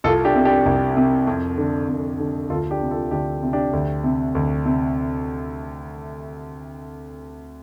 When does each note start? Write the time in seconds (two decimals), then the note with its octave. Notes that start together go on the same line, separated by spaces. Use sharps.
0.04 C2 F4 A4
0.25 D4 G4
0.35 C3
0.45 D4 G4
0.66 C2
0.97 C3
1.27 F2
1.58 D3
1.88 F2
2.20 D3
2.50 D2 F4 A4
2.71 D4 G4
2.81 C3
2.91 F4 A4
3.11 D2 D4 G4
3.43 C3
3.53 D4 G4
3.73 D2
4.04 C3
4.35 D2
4.65 C3